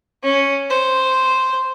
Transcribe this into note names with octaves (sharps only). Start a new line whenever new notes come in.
C#4
C5